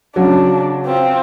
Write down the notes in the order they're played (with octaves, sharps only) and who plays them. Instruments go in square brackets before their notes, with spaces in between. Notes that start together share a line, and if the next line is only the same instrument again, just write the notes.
[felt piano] C#3 F#3 [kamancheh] D4
[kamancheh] C4 F4